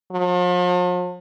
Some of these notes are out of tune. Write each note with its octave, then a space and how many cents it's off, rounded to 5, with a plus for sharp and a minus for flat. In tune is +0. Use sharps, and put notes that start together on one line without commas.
F3 +45